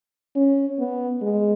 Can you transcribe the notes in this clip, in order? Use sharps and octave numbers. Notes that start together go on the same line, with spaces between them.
C#4
B3
G#3